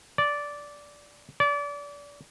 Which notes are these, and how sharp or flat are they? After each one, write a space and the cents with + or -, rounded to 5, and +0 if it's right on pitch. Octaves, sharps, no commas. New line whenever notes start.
D5 -10
D5 -30